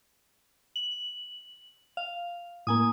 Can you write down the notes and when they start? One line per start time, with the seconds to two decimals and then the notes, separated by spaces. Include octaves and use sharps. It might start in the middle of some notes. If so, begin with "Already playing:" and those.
0.76 F#7
1.97 F5
2.67 A2 A#3 G#5 D#6